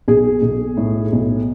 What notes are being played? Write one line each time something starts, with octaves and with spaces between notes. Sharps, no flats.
B1 G#4
B1
A2
B1